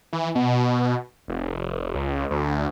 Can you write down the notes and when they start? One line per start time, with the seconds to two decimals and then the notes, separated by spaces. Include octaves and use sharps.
0.13 E3
0.35 B2
1.28 F1
1.95 C#2
2.31 D2